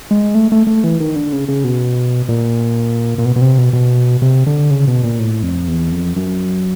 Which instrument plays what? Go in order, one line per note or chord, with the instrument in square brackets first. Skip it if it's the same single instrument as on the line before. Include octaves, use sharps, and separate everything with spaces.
[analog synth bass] G#3
A3
A3
A3
E3
D#3
D3
C#3
C#3
B2
A#2
A#2
B2
B2
C3
B2
B2
C3
D3
C#3
B2
A#2
A2
F2
E2
F2
F#2